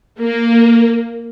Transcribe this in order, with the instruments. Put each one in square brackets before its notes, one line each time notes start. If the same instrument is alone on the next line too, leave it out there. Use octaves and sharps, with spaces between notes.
[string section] A#3